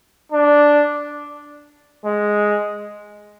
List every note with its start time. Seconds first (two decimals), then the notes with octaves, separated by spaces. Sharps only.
0.32 D4
2.06 G#3